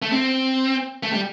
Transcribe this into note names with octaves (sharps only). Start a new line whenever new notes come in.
A3
C4
A3
G3